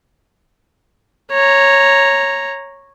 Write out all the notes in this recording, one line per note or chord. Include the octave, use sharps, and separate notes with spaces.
C#5 A#5